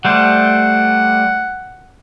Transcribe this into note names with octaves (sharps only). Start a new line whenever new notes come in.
G3 A3 C5 F#5